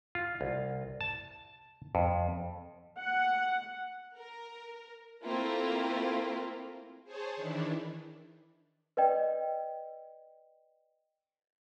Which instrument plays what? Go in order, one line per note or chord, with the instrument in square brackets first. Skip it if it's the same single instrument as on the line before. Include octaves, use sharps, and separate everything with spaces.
[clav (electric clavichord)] F4
C2
A5
F2
[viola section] F#5
[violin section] A#4
A3 A#3 C4 E4 F4 A#4
[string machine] G#4 C5 C#5 A5
D#3 E3 D4 E4
[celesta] B4 D5 D#5 G5